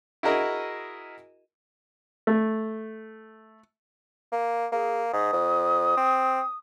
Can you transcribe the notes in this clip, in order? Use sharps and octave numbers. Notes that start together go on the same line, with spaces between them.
E4 F#4 G#4 A#4 D#5 E5
A3
A#3
A#3 G#4
G#2 D#6
F2
C4